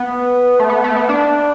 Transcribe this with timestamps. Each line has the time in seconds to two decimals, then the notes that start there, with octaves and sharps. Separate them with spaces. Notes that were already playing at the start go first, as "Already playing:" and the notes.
Already playing: B3
0.59 A3
0.69 B3
0.84 A3
0.96 B3
1.09 D4